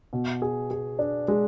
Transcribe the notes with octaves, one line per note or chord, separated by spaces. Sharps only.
B2
G#4
G#4
D4
G#3